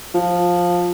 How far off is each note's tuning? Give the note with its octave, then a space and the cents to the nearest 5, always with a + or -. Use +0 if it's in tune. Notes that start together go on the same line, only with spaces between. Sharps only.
F3 +10